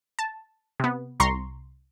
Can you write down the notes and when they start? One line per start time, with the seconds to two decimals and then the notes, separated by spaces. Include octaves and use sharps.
0.19 A5
0.80 C3 B3
1.20 C2 A#5 C6 C#6